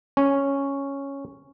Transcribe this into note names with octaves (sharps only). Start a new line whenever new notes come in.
C#4